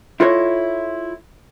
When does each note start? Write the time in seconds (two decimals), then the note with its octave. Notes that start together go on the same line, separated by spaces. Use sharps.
0.20 E4 F4 A4 A#4 C#5 D#5